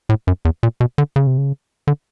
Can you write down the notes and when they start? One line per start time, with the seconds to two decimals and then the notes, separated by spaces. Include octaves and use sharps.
0.09 A2
0.27 F#2
0.45 E2
0.63 A#2
0.80 B2
0.98 D3
1.16 C#3
1.27 C3
1.38 C#3
1.87 D3